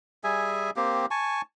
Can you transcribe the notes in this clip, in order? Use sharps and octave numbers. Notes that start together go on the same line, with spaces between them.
G3 G#4 E5 G#5
A#3 C4 G4
G#5 A5 C#6